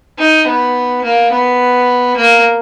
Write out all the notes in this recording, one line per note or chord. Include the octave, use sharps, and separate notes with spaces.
D#4
B3
A#3
B3
A#3